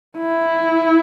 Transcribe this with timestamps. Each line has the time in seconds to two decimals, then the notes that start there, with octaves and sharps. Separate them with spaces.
0.17 E4